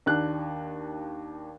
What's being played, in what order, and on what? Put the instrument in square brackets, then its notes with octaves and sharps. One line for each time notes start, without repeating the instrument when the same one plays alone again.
[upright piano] D#2 D4 F#6